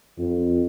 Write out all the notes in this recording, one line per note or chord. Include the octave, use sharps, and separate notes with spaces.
F2